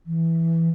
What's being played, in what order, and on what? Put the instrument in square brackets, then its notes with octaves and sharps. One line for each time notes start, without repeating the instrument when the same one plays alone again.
[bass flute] E3